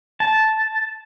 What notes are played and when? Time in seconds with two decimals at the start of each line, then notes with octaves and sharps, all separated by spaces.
0.20 A5